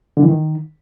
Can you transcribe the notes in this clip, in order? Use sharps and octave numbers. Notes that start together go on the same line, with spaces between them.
D3
E3
D#3